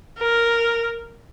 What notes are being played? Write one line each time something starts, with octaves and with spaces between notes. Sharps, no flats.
A#4